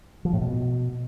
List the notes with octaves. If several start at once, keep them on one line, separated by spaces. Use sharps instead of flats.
F3
A2
B2